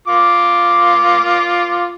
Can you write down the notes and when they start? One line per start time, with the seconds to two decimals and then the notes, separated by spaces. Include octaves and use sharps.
0.08 F4 D6